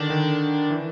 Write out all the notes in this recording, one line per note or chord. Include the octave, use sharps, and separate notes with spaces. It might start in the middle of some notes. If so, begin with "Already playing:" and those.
Already playing: D3 D#3 D4
D#3
E3